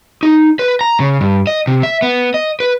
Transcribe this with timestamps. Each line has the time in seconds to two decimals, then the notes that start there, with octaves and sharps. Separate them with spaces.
0.23 D#4
0.59 B4
0.81 A#5
1.00 C#3
1.21 G2
1.47 D#5
1.67 C3
1.83 E5
2.02 B3
2.34 D#5
2.60 B4